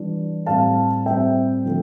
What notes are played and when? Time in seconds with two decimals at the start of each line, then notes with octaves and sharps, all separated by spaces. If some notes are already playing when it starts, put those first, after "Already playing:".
Already playing: E3 G3 D4
0.46 A2 G3 C4 F5 A5
1.06 A2 G3 C4 E5 G5
1.64 D3 F3 A3